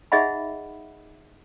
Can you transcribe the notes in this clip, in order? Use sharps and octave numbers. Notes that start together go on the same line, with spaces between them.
D#4 G#4 D#5 E5 F#5 B5